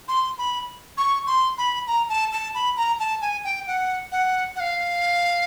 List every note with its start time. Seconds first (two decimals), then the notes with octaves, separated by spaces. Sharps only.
0.08 C6
0.38 B5
0.98 C#6
1.27 C6
1.58 B5
1.87 A#5
2.09 A5
2.33 A5
2.54 B5
2.76 A#5
3.00 A5
3.21 G#5
3.44 G5
3.67 F#5
4.12 F#5
4.56 F#5
4.60 F5